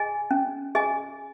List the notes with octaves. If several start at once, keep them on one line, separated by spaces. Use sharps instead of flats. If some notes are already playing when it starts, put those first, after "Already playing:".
Already playing: G#4 D#5 G#5
C#4
G#4 D#5 G#5